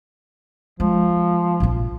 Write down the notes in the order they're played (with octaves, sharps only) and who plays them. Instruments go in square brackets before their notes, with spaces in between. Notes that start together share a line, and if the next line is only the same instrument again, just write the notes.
[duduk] F3 [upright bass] G#3
[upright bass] A#1 F4